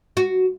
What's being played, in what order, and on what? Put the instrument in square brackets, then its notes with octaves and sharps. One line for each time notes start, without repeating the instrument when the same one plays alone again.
[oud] F#4